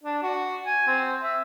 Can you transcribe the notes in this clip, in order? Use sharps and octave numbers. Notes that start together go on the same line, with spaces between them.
D4
F#4
G#5
C4
E5